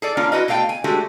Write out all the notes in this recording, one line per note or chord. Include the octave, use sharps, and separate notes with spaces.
G#4 A4 D5
A#3 C#4 D4 F4
E4 F#4 B4 D#5
B2 A3 F5 G5
G#5
G#3 A3 D4 F#4 G4